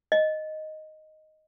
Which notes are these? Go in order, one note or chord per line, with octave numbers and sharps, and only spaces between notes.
D#5